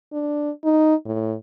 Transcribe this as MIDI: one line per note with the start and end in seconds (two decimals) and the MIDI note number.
0.13 0.50 62
0.64 0.95 63
1.06 1.35 45